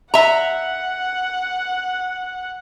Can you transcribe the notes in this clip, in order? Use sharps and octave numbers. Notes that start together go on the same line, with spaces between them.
E5 F#5 A#5